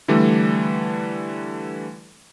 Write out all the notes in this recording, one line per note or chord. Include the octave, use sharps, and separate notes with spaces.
D3 E3 G3 A3